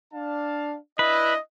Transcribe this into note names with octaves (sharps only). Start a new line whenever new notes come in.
D4 F5 A5
D4 E4 B4 D#5